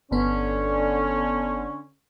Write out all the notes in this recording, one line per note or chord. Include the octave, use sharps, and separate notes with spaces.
G1 D3 B3 C#4